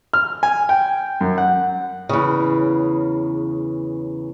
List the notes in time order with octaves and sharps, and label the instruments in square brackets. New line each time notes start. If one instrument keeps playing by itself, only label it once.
[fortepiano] F6
G#5
G5
F#2
F#5
[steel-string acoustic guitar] E2 C#3